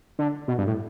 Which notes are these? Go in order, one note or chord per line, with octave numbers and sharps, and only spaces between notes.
D3
B2
G2
A2